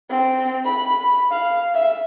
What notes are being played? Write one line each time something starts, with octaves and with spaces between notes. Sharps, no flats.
C4
B5
F5
E5